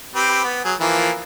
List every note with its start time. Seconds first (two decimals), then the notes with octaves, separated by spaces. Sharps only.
0.15 C4 G4 B4
0.44 B3
0.64 F#3 G#4
0.80 E3 F3 A#3